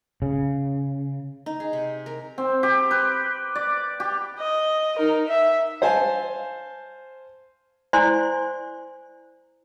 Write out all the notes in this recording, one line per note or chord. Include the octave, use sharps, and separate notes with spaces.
C#3
D#4
G#4
C3
A#4
C4
G4
B4
D5
G4
D#5
D#4 A#4
E5
C5 F5 G#5 A5
E4 C5 D5 G#5 C6